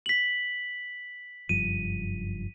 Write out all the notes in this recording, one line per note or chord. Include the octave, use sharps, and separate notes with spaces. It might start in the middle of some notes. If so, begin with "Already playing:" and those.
B6 F#7
F#1 G2 F3 D#7